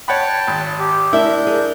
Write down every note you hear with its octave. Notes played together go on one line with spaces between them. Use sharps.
C#5 F#5 G5 A5 B5
G#1
G4
D4 E4 A#4 E5 G6
G#4 A#4